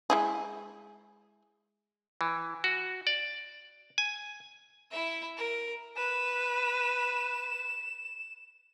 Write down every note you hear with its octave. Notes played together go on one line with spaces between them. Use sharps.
G#3 E4 G#4
E3
F#4
D5
G#5
E4 E5
A#4
B4 E7